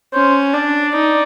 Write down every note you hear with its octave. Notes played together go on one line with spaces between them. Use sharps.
C#4 C5
D4 D5
D#4